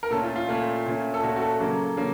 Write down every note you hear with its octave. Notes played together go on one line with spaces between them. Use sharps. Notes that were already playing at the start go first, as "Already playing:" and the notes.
A#4
A#2 A3 C#4 A4
F4
F4
A#2 A3 C#4
A#2 A3 C#4
A4
A#2 A3 C#4 F#4
F#4
A4
C#3 F#3 A#3 C#4
C#3 F#3 A#3 C#4